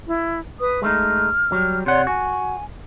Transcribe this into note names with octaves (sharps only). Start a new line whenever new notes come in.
E4
B4 D#6
G#3 A3 D#4 F6
F#3 G3
C3 C#5 D5 F#5 C6
F#4 G#5